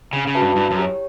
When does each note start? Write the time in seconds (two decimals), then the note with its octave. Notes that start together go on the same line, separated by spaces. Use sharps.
0.13 C#3 C#4
0.27 C#3
0.35 F#4 B4 E5 A5
0.41 G2
0.56 G2 E4
0.71 F#2
0.79 G4 C#5